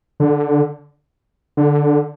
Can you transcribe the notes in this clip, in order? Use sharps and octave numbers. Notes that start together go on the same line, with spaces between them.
D3
D3